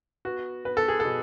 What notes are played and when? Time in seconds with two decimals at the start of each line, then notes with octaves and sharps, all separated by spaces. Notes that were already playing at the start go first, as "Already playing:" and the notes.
0.25 B3 F#4
0.65 B3 B4
0.77 A4
0.88 G#4
1.00 A4
1.05 B2